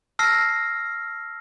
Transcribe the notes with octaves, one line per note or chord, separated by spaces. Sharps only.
A5 E6 F6 A#6 C7